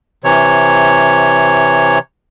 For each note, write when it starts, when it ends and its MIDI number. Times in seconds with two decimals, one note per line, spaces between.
0.24 1.99 48
0.24 1.99 52
0.24 1.99 73